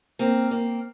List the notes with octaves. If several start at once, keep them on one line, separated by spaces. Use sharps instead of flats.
A#3 C4
A#3 C4